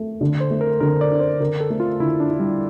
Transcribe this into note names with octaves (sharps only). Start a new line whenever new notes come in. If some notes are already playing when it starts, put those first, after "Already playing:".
Already playing: A3
D3
C5
A3
A#4
D3 A#4
D5
D4
C5
D3 A#4
A4
A3
F4
D3 E4
D4
E4
G3